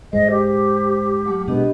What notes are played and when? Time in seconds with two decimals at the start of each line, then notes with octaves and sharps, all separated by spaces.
0.13 G#2 G#3 C5 D#5
0.31 G4
1.26 F#3 A3 F#5
1.47 B2 G#3 B3 D4 G4 D#5